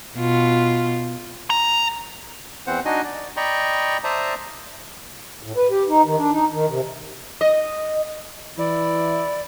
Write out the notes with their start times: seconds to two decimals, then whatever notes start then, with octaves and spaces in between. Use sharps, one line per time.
0.16 B2 F4
1.50 A#5
2.67 E2 E3 C4 C5 F#5
2.85 D4 D#4 F#4 D#5 G#5
3.04 D5
3.37 D5 D#5 G5 A#5 B5 C#6
4.04 C5 D5 E5 A5 A#5 D#6
5.43 A2
5.57 B4
5.70 G4
5.88 D#4
6.06 D#3
6.18 D4
6.32 D#4
6.52 D#3
6.69 C3
7.41 D#5
8.59 E3 E4 D5